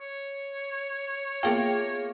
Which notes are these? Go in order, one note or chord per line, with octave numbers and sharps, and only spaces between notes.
C#5
A#3 B3 F4 G#4 G5 A5